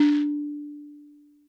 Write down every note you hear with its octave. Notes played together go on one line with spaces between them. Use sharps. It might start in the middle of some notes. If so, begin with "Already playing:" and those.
Already playing: D4